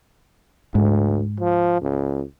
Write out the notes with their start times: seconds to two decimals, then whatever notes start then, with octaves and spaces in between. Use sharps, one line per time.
0.75 D2 G#2
1.40 F3
1.81 C#2